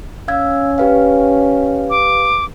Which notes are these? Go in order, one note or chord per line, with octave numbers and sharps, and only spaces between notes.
C#4 F5 E6 G#6
G4 B4 F5
D6